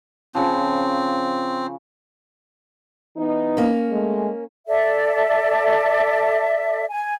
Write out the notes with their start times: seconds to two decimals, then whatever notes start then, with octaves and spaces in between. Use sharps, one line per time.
0.35 C#3 F3 C4
3.17 E3 B3 D#4
3.57 A#3 C#4
3.90 G#3 A3
4.67 A4 D5 E5
6.89 G#5